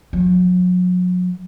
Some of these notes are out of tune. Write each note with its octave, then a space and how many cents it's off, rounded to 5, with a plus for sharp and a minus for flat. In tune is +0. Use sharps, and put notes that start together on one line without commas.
F#3 -40